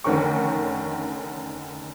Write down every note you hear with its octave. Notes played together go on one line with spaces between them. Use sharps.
F1 D3 D#3 C#4 A#4 C#6